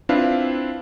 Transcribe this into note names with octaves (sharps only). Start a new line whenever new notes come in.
C4 D4 E4 F4 B4 F5